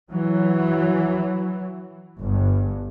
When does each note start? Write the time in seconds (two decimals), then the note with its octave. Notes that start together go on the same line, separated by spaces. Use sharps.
0.11 E3 F#3
2.19 G1 G2